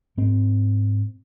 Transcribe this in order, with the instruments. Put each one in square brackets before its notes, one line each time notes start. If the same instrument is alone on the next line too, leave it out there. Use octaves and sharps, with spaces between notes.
[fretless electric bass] G#2 C4